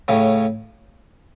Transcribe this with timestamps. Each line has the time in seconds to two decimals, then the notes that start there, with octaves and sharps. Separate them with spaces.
0.08 A2 C#3